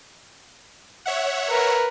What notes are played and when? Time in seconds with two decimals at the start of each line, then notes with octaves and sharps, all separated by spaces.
1.06 C#5 E5 F#5
1.49 A#4 B4